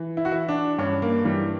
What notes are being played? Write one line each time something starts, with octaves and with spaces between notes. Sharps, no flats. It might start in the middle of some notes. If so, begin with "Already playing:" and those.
Already playing: E3
E4
F#4
E3 E4
D4
G2 C#4
A#3
E3 G3